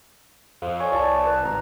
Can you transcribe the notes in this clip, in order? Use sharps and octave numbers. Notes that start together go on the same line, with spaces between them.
F2 F5
C#5 G#5 C#6
C2 D5 A5
B4
G#1 A#5